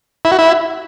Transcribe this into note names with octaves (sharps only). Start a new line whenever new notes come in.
E4
F#4
E4